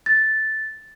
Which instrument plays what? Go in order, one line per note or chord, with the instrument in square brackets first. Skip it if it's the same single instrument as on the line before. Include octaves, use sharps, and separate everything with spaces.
[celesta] A6